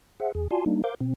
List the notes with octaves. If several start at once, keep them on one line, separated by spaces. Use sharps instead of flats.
G#4 C5 E5 F#5
E2 G#4
F4 F#4 D5 G#5 A5 C6
G3 A#3 D4 D#4
A#4 C5 F5 D6 G6
B2 C4